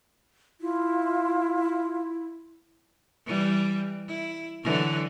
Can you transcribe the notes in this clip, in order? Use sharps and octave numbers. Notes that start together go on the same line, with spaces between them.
E4 F4
E3 G3
E4
D3 E3 F#3